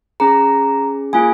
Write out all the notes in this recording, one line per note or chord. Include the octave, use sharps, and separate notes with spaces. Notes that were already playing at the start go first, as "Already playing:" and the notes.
C#4 G#4 A#5
A#3 F4 G#4 G#5